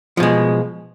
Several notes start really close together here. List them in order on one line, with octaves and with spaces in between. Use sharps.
F3 B2 G#3